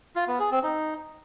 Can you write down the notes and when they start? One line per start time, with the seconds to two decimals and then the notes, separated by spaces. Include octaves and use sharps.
0.16 F4
0.28 B3
0.39 G#4
0.51 C4
0.63 D#4